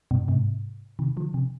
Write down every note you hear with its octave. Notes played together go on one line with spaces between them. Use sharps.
G2 B2
G#2 C3
C3 D#3
D3 F3
C3